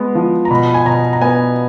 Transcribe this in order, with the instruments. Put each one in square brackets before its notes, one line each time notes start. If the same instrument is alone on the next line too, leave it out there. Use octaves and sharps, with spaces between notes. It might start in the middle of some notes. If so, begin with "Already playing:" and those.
Already playing: [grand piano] G#3 B3
F3
A#5
B2 B5
G#5
B2 A#5
A#5
B3 G#5